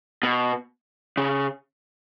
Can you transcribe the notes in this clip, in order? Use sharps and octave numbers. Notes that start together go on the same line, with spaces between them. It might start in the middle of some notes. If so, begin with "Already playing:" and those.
B2
C#3